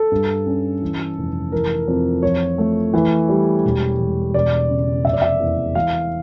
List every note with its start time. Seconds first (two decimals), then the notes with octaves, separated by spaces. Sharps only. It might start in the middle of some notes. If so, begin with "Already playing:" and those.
Already playing: A4
0.12 G2
0.46 C#4
0.82 E3
1.17 F1
1.52 E3 A#4
1.88 F2
2.22 F3 C#5
2.58 A3
2.94 E3
3.29 G3
3.64 E1
3.99 E1
4.34 E1 D5
4.70 C#3
5.05 F1 E5
5.13 D5
5.22 E5
5.40 E2
5.75 E3 F5